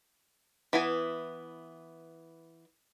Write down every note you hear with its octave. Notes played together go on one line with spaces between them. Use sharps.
E3 B3 E4 G#5